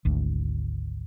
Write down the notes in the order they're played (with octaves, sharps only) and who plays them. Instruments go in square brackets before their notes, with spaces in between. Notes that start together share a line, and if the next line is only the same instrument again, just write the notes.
[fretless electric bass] G#1 D2